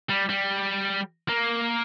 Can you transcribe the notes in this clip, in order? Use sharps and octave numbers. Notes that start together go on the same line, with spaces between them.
G3
G3
A#3